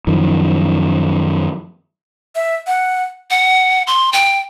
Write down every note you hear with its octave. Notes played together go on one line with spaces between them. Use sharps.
F#2 D#3 F3
E5
F#5
F#5
C6
G5